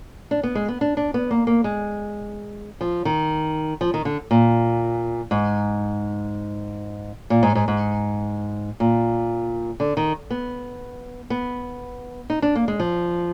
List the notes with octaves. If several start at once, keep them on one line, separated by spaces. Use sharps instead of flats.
D4
B3
G#3
B3
D4
D4
B3
A#3
A#3
G#3
F3
D#3
F3
D#3
D3
A#2
G#2
A#2
G#2
G#2
G#2
A#2
D3
D#3
B3
B3
D#4
D4
A#3
G#3
F3